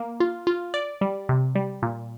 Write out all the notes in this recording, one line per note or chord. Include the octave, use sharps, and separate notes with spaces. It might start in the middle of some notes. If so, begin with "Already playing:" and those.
Already playing: A#3
F4
F4
D5
G3
C3
G3
A#2